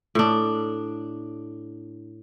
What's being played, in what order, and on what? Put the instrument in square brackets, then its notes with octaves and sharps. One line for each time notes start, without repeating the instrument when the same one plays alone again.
[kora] A2 D4